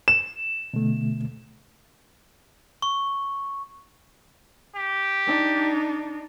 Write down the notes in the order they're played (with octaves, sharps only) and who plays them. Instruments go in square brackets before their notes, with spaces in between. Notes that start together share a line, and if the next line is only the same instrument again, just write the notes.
[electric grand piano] E7
[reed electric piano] B2 D3 A3
[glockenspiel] C#6
[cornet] G4
[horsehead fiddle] D4 D#4